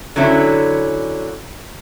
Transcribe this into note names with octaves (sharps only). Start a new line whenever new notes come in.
D3 F#3 C#4 E4